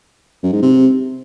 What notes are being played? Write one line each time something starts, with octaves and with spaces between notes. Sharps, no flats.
F#2
G#2
C3